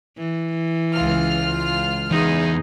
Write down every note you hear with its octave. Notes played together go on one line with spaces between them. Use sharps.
E3
C#2 F4 F6
E2 E3 D#4 G#4